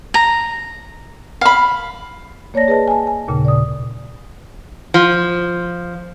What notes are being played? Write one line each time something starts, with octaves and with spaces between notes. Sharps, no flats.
A#5
F5 B5
A#3 C#5 D5 A5 A#6
G#4 B4 D#5 A5
G#5 A5
G#5
D#2 A#2 C#3
D5 D#6
F3